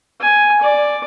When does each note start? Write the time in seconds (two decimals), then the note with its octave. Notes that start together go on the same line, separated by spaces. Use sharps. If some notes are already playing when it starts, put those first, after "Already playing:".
0.20 G#5
0.61 D5